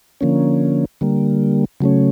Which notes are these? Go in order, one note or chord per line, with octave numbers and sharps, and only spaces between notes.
D3 F3 A#3 C#4
D3 G3 A#3
C#3 F#3 A3 C#4